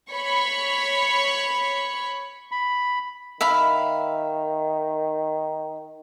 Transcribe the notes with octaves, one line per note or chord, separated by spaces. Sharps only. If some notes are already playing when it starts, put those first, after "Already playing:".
C#5 B5 C#6
B5
D#3 E5 F5 B5